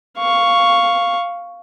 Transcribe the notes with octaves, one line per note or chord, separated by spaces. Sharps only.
F5 C#6